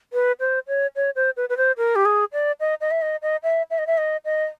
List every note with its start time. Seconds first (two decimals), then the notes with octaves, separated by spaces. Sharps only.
0.13 B4
0.40 C5
0.68 C#5
0.96 C#5
1.16 C5
1.37 B4
1.49 B4
1.57 C5
1.77 A#4
1.96 G4
2.05 G#4
2.33 D5
2.60 D#5
2.81 D#5
2.91 E5
3.02 D#5
3.22 D#5
3.43 E5
3.70 E5
3.78 D#5
3.87 E5
3.98 D#5
4.25 D#5